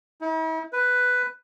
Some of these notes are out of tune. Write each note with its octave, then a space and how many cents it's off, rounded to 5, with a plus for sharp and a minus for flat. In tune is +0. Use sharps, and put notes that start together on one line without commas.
E4 -45
B4 +5